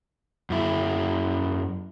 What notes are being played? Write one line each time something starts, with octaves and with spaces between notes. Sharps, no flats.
F#2 E4